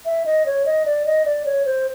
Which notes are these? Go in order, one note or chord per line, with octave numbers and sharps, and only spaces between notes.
E5
D#5
C#5
D#5
D5
D#5
D5
C#5
C5